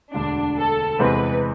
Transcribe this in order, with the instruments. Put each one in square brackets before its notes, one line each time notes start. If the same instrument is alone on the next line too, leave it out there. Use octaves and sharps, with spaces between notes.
[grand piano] E1 D2 D3 [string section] D4
[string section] A4
[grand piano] E2 C3 G#3 C4 [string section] B4